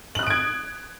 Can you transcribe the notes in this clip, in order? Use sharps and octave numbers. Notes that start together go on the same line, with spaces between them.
D#6 F#6 G#6 D7 F#7